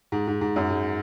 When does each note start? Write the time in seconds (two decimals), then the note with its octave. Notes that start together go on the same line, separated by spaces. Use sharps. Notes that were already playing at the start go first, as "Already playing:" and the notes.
0.12 G#2
0.27 G#2
0.41 G#2
0.56 F#2
0.70 G#2